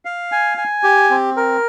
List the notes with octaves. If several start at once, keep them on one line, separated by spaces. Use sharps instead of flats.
F5
G#5
G#5
G4
C4
A#4